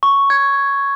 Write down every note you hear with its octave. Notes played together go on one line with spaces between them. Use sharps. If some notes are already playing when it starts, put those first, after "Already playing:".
C#6
G#6